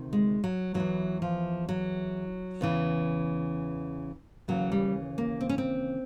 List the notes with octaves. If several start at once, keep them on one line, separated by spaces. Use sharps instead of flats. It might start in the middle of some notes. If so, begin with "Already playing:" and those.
Already playing: D2 C3 D#3
G#3
F#3
E2 C3 F#3
E3
F3
F#3
E2 C#3 E3
D#2 C#3 E3 F#3
G3
A#3
C4
C#4
C4